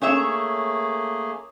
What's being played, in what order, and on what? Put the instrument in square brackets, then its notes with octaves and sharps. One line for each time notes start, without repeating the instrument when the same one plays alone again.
[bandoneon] A3 A#3 G#4 [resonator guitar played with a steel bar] C#4 C#5 E5